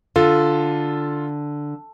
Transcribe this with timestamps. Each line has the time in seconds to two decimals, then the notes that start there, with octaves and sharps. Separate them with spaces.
0.16 D3 F4 A4